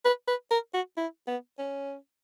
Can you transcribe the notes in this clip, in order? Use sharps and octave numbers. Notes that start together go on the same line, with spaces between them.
B4
B4
A#4
F#4
E4
B3
C#4